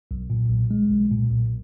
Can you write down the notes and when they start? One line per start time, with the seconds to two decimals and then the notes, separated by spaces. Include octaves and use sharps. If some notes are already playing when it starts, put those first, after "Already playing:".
0.11 B1
0.30 A#2
0.50 B1
0.71 G#3
0.91 B1
1.11 A#2
1.31 B1